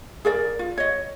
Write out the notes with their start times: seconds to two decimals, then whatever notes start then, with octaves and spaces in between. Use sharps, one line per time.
0.25 G#4 A#4 D5
0.59 F4
0.78 C#5 D#5